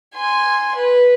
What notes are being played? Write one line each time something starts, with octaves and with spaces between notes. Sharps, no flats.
G#5 C6
B4